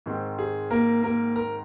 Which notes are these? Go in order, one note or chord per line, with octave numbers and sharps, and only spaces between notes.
G#2 D#3 G#3 C4
G#4
A#3 A#4
A#3 A#4
A#4 A#5